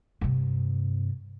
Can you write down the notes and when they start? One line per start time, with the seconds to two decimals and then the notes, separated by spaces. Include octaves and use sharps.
0.21 G2 C3